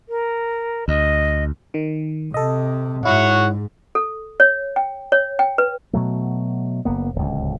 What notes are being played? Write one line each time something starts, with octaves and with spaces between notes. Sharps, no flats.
A#4
D2 D#5
D#3
C3 A4 D#5
G#2 E4 C#5 F#5
A4
C#5
G5
C#5
G5
B4
B2 F#3 A3
F#1 A#3 B3
D1 C#2